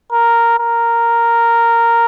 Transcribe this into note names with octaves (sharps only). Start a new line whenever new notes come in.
A#4
A#4